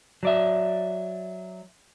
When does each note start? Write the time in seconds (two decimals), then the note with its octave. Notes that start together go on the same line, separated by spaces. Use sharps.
0.23 F#3 D5 E5